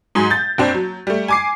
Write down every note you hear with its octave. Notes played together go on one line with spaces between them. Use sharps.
G#2 F#3 G#5
G6 A6
F#1 C4 D4
F#3
G3 A3
G#5 D6 C7